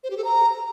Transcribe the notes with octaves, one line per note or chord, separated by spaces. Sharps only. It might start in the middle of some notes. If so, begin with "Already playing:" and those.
C5
G4
A4
A#5